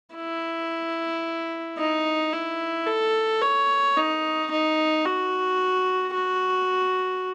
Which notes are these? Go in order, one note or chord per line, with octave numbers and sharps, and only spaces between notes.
E4
D#4
E4
A4
C#5
D#4
D#4
F#4
F#4